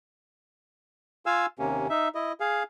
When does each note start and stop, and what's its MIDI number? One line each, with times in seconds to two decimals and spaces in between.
1.26 1.46 65
1.26 1.46 77
1.26 1.46 80
1.26 1.46 88
1.59 1.87 39
1.59 1.87 48
1.59 1.87 58
1.59 1.87 61
1.90 2.08 63
1.90 2.08 76
2.15 2.32 64
2.15 2.32 75
2.40 2.63 68
2.40 2.63 77